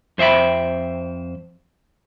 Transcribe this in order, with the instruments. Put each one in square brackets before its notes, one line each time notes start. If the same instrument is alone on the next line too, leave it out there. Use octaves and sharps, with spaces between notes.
[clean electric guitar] F2 C5 E5 G5 B5